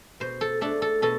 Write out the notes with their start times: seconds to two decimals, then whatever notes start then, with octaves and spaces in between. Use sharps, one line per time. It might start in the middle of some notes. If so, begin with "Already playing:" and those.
0.20 B2 C5
0.41 A4
0.61 A3 D4 A4
0.82 A4
1.02 B2 A4